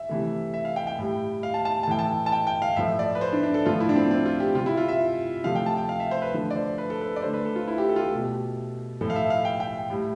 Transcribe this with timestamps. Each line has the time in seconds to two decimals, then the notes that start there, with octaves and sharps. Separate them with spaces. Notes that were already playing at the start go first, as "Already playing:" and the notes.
Already playing: E5
0.09 C3 E3 A3
0.54 E5
0.65 F5
0.76 G5
0.87 G5
0.99 A2 G3
1.43 F5
1.54 A5
1.65 A5
1.83 A5
1.87 A2 E3 A3 G5
1.99 A5
2.26 A5
2.32 G5
2.47 G5
2.62 F5
2.76 A2 F3 A3 E5
2.99 D5
3.15 B4
3.21 C5
3.33 D4
3.43 D4
3.54 A4
3.66 A2 F3 A3 F4
3.80 E4
3.89 D4
3.96 C4
4.11 C4
4.26 F4
4.40 G4
4.55 C3 F4
4.59 G3
4.66 E4
4.77 F4
4.88 E5
5.44 C3 F3 A3 F5
5.55 G5
5.66 A5
5.77 G5
5.89 F5
6.00 E5
6.11 C5
6.22 B4
6.33 D3 F3 A3
6.51 D5
6.56 C5
6.78 B4
6.90 A4
7.01 B4
7.16 D5
7.22 D3 A3 C5
7.33 B4
7.45 A4
7.56 F4
7.68 E4
7.78 G4
7.89 A4
7.96 F4
8.00 G4
8.12 B2 A3
9.01 A2 F3 A3 A4
9.10 F5
9.16 E5
9.30 F5
9.45 G5
9.60 G5
9.90 A2 G3